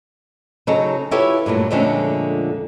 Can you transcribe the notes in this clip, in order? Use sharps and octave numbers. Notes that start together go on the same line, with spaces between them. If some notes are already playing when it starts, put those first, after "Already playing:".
C#3 F#3 D#4 A4 C#5
E4 F4 G4 A4 B4 C#5
G2 A#2 F#3 A3
F2 A#2 D3 G#3 A3 C#4